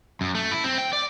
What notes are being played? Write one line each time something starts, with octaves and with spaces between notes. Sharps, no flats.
F#2
A3
E4
C4
G5
D5